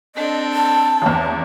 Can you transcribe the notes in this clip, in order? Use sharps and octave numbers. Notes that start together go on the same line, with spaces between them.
C4 D4 A4 D#5
A5
A1 E2